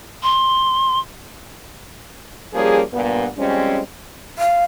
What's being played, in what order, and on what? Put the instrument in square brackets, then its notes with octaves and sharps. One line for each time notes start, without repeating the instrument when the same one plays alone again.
[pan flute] C6
[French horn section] F3 G3 A#3 C#4 G#4
G2 A#2 B3
F2 G3 G#3 C4 C#4
[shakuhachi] F5